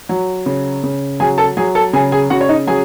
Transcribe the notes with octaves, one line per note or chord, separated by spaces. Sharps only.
F#3
C#3
C#3
F#3 G#4 G#5
A4 A5
F#3 G#4 G#5
A4 A5
C#3 G#4 G#5
G#4 G#5
C#3 F#4 F#5
C#5
D#4 D#5
F#3 G#4 G#5